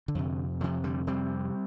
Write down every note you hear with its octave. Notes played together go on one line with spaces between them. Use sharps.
D3
F2 C3
F2 C3 F3
D3 G3
F2 C3 G3 C4